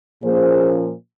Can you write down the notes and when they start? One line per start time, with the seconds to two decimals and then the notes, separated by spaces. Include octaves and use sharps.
0.23 A#2 F3 A#3 C#4 G#4 C5